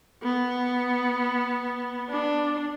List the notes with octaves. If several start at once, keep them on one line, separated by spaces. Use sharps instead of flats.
B3
D4